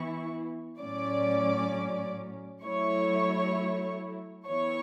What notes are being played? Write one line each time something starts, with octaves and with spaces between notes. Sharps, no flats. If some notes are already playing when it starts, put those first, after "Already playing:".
Already playing: E3 B3 E4 C#6
A2 F#3 C#4 D5 D6
F#3 A3 E4 C#5 C#6
E3 B3 E4 C#5 C#6